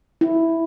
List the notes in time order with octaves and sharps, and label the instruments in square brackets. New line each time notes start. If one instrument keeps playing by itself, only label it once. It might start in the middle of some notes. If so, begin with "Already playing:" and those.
[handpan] E4